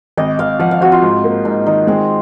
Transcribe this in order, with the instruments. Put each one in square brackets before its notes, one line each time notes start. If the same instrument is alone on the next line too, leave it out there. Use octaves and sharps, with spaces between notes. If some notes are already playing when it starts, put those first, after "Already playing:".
[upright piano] G#1 [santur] D#5
[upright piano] G#1 [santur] F5
[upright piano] F3 [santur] F#5
[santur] F5
[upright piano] C4 [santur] F#4
[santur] F4
[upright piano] G#2
A#3
[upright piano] G#2 [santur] D#4
[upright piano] D#3 [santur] D#4
[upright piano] G#3 [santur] C4